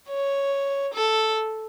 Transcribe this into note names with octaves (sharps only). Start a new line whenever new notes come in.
C#5
A4